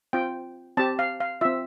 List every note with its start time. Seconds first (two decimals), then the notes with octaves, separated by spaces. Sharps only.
0.13 C4 F4 G5
0.77 C4 G4 A5
0.99 F5
1.20 F5
1.41 C4 F4 E5